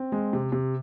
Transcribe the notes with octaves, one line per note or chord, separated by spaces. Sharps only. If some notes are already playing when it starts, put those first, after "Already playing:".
Already playing: C4
G#3
C3
C3